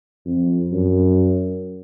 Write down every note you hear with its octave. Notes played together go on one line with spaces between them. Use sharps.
F2
F#2